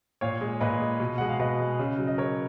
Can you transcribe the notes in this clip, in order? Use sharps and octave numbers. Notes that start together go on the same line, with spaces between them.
A#2 C#5 F5
G#3
A#2 B4 D#5
G#3
B2
G#3 F#5
F5
B2 B4 D#5
G#3
C#3
F#3
D#5
C#3 A#4 C#5